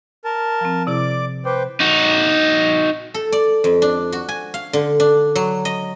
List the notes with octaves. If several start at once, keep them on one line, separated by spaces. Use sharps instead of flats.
A#4 A5
F3 C4
C3 E4 G#4 D5 D6
B4 C5 G5 D6
D#4 F#4
A4
D5
F2
D4
F#4
G#5
F5
D3
D4
F#3
D#5